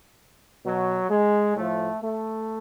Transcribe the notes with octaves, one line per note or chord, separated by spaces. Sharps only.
B2 F#3
G#3
A2 F3 A3
A3